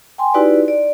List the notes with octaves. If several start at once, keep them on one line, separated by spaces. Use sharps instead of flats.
G5 G#5 C6
D#4 E4 F#4 G4 B4 D5
D5